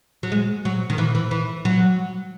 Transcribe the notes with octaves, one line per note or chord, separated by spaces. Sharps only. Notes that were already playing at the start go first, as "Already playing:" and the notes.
F#3
G#3
F#3
D#3
E3
E3
E3
F#3